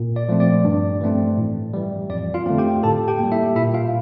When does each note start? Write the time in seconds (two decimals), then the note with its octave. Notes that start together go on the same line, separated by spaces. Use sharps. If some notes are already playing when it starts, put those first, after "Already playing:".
Already playing: A#2
0.16 D5
0.28 F3 A3 C4
0.40 D5
0.64 G2
1.01 E3 A3 C4
1.38 A2
1.74 E3 G3
2.10 F2 D5
2.34 F4 F5
2.46 D3 A3 C4
2.58 G4 G5
2.83 A2 A4 A5
3.08 G4 G5
3.19 G3 A#3
3.32 E4 E5
3.55 A#2 E4 E5
3.74 F4 F5